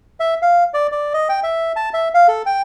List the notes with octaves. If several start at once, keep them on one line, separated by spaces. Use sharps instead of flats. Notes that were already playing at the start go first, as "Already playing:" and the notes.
E5
F5
D5
D5
D#5
G5
E5
A5
E5
F5
A4
G5